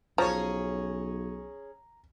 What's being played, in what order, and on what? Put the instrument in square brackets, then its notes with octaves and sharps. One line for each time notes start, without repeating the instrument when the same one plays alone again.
[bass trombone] B1 [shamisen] F3 [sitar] C#4 G#4 C#5 [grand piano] A#5